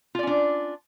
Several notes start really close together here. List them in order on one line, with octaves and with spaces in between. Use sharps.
F4 D5 C#4 D4